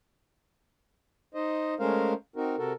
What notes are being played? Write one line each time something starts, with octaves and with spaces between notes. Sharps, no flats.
D#4 C5 D#5
G#3 A3 C#4 A#4 C5 F5
C4 D#4 F#4 A#4
C3 F#4 A4 A#4